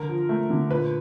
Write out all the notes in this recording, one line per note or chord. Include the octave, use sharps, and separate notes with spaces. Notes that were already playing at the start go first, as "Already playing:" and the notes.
Already playing: D3 A#4
F3
A3
D3
A#2 B4